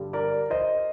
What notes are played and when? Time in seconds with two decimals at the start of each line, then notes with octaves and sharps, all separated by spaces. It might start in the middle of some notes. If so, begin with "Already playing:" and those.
Already playing: G2 D3 G3
0.13 A#4 D5
0.50 C5 D#5